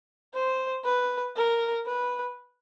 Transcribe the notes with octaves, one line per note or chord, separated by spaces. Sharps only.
C5
B4
A#4
B4